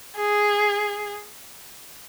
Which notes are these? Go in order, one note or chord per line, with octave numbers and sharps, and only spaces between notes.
G#4